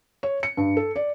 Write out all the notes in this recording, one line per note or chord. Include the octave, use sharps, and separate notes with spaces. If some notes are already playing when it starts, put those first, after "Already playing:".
C#5
C#7
G2
A4
D5